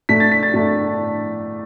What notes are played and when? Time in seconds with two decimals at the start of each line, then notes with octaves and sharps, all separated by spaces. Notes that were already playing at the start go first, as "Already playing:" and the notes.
0.09 A2 A3 D4 B6
0.20 A6
0.31 B6
0.43 A6
0.54 A2 A3 D4